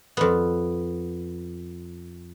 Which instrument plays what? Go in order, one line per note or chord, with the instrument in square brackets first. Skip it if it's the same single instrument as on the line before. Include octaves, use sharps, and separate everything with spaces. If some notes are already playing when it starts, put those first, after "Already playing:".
[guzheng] F2 B3